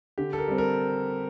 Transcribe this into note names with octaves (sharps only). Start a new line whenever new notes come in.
D3 G4
A4
A#4
G3 C4
A#4